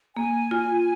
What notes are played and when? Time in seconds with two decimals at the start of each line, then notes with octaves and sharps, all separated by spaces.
0.16 A#3 G#5
0.51 F4